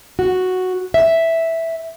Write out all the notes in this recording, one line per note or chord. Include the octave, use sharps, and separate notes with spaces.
F#4
E5